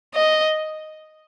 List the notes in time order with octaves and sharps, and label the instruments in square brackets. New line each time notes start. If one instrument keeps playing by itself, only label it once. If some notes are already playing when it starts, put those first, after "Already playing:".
[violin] D#5